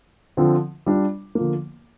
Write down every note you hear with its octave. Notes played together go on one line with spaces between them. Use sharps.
D3 F3 C4
G3 D4 F4
D3 F3 A#3